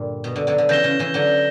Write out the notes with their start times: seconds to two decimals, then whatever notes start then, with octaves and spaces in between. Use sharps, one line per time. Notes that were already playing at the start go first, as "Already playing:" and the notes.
Already playing: G2 A#2 D3
0.24 B2
0.36 D3
0.47 D3 F#3
0.58 D3
0.69 C#3 E3 G6 A#6 E7 G7
0.84 C#3
0.99 C#3 E3
1.14 D3 F#3